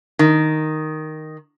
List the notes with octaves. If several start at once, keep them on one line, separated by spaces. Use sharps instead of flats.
D#3